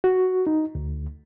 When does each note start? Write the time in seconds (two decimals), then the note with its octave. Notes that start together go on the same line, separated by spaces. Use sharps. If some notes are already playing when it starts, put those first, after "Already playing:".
0.04 F#4
0.47 D#4
0.75 D2